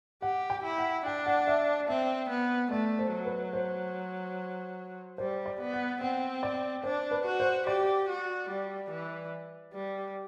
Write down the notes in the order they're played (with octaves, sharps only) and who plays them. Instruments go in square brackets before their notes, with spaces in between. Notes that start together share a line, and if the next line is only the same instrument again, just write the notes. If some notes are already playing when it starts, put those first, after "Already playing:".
[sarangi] G4 [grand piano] F#5
[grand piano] G5
[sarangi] E4
[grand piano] F#5
[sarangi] D4 [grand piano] G5
[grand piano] F#5
E5
[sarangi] C4 [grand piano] E5
[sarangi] B3
[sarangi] A3 [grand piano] D5
[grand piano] C5
[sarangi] F#3
[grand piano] B4
C5
[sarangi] G3 [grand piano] C5
[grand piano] D5
[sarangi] B3
[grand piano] F#5
[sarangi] C4 [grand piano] F#5
[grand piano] D5
[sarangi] D4 [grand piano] C5
[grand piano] B4
[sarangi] F#4
[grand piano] C5
[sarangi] G4 [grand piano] D5
[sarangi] F#4
G3
E3
G3